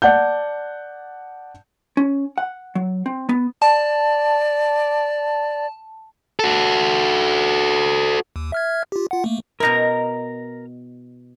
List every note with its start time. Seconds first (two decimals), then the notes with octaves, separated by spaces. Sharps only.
0.02 D5 F#5 A5 G6
1.97 C#4
2.38 F#5
2.75 F#3
3.06 C4
3.29 B3
3.62 D5 A5
6.40 F#4 A4
8.36 D#2
8.52 E5 F6 G#6
8.92 F4 G4
9.11 F4 F#5
9.24 A3 A#3
9.60 B2 D#4 E4 A#4 A#5